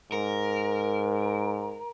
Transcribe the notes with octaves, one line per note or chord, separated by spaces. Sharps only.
G#2 A#4